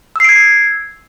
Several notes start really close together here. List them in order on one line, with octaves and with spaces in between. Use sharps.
E6 C7 D7 G#6